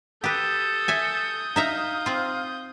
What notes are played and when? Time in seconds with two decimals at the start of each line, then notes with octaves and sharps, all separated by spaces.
0.24 G4 A4 B4 D#6 G6
0.88 E5 G#5
1.56 D#4 E5 F5 A#5
2.06 C4 F4